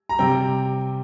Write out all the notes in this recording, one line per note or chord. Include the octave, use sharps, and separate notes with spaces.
A#5
C3 G3 C4 G5